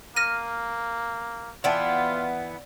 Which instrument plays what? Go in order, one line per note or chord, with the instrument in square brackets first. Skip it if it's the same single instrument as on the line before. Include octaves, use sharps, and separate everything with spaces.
[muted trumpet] A#3 [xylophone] F6 A#6 D#7
[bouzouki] E3 B3 [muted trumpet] F4 [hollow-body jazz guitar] D5 G5 A5